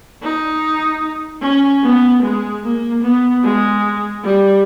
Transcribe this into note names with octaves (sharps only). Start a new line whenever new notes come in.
D#4
C#4
B3
G#3
A#3
B3
G#3
G3